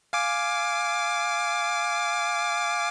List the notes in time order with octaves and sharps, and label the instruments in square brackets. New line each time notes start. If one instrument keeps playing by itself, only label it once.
[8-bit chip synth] F5 G#5 D6